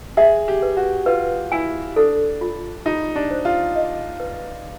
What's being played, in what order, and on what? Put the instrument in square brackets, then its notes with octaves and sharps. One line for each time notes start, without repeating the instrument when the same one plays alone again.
[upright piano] G#4 [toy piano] E5
[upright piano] G4
[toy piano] B4
[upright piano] F#4
[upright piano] F4 [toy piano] B4
[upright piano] E4 [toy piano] G#5
[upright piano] D4 [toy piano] A4
[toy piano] F4
[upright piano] D#4 [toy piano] F4
[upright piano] D4
[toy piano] C5
[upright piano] F4
[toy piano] D#5
B4